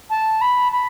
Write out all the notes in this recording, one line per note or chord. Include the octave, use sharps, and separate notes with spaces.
A5
B5
B5